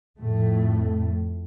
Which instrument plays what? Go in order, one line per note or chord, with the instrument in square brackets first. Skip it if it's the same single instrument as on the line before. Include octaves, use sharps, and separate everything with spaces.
[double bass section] F2 A2 A3